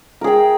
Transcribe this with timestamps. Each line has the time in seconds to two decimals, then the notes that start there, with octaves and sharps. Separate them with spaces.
0.21 A#4
0.24 G#4
0.27 G5